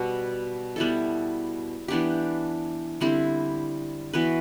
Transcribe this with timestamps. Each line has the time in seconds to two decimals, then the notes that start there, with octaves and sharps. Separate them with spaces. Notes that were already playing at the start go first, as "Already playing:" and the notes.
Already playing: B2 G3 B3 F#4
0.76 G3 B3 E4 A4
1.88 E3 B3 D4 G4
3.01 D3 G3 C4 E4
4.13 E3 B3 F#4 B4